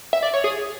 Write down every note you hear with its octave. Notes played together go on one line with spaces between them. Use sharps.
E5
D5
C#5
G#4